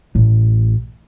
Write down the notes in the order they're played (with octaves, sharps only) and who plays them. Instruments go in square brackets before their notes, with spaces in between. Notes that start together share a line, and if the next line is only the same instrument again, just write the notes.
[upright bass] A1